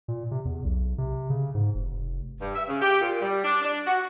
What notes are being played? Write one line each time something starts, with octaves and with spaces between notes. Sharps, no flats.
A#2
C3
E2
B1
C3
C#3
G#2
F1
G2
E5
C#3
G4
A#2
G3
D4
D4
F#4